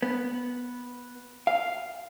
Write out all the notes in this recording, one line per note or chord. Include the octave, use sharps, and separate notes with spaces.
B3
F5